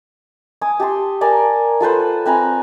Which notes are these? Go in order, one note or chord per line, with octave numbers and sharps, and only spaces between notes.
G#5 D6 D#6
G4 A5 C6
A#4 D5 G#5 A5
F4 A4 B4 C5
C4 B4 G#5 A#5